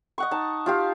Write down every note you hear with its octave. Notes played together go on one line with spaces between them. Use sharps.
D#5 F#5 C#6
D#4 A5
F4 G4 F5